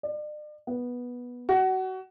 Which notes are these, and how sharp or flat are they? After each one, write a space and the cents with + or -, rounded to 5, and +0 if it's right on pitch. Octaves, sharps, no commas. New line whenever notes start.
D5 +40
B3 -10
F#4 +25